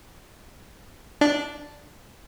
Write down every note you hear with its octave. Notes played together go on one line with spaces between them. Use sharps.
D4